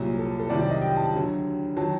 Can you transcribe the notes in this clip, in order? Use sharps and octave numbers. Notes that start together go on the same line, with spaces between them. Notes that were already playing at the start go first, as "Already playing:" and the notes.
Already playing: C2 A#2 F#3
A4
A4
C2 C3 D#3 F#3 D5
D5
D#5
G5
A5
D2 D3 F#3
D#3 F#3 A5